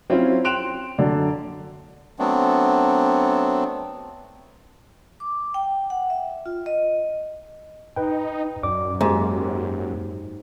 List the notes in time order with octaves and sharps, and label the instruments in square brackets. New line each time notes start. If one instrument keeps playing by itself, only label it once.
[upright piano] F#3 C4 C#4 E4 F4
G5 C6 F#6 D7 E7 F7
F#2 D3 D5
[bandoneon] F#3 A3 B3 C4 D4
[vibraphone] D6
G5
F#5
E5
F4
D#5
[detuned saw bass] D#4 [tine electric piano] B4 G5
[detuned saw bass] F#2 [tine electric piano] D5 D6
[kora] G#2 [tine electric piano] A#3 G4